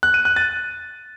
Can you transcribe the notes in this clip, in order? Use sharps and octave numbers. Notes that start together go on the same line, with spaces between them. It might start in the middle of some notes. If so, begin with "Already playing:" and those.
F#6
D#7
F#6
A6